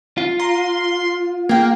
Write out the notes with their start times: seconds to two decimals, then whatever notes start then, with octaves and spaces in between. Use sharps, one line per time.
0.18 F4
0.40 A#5 C6
1.49 A#3 G#4 G5